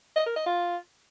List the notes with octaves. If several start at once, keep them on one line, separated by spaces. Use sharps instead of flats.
D#5
A#4
D#5
F4